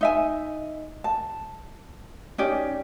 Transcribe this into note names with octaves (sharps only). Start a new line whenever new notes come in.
D#4 E5 G#5
A5
C#4 D#4 G4 D5